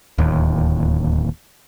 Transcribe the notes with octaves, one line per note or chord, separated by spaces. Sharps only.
D1 D#2